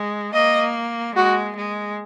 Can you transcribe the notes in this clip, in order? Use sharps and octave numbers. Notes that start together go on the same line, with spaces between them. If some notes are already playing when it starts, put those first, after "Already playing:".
Already playing: G#3
A#3 D#5
G#3 F#4
G#3